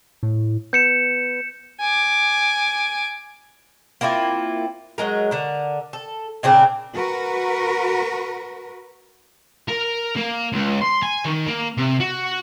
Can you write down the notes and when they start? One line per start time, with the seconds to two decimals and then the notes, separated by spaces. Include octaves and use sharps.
0.23 A2
0.73 B3 G6 C#7 E7
1.80 G#5 D6
4.01 A#3 C4 E4 F4
4.98 F#3 G#3 A#4
5.31 D3 A#4
5.93 A4
6.43 A#2 C#3 C4 D4
6.94 F#4 A#4 B4
9.68 A#4
10.16 A#3
10.53 C#2
10.82 C6
11.03 G#5
11.25 D#3
11.46 A#3
11.77 C3
12.00 F#4